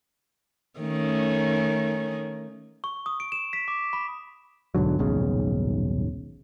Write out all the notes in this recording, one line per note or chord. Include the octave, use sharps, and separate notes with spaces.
D#3 A3 C#4
C#6
D#6
D7
E7
B6
D6
B5
B1 G#2 D3 F#3
D#1 B1 G#2 C#3